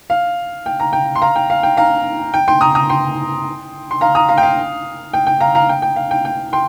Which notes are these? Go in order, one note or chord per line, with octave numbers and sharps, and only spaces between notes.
F5
G5
A#5
G5
C6
F5 A#5
G5
F5
G5
F5 A#5
G5
G5 C6
A#5 D#6
A#5 D#6
G5 C6
C6
F5 A#5
A#5 D#6
F5 A#5
G5
F5
G5
G5
F5 A#5
F5 A#5
G5
G5
F5
G5
G5
G5 C6